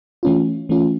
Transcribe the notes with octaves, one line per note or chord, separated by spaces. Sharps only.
E3 A3 C#4 F4
E3 A3 C#4 F4